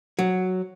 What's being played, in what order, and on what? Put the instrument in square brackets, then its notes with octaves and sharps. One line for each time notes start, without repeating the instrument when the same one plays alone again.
[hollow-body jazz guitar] F#3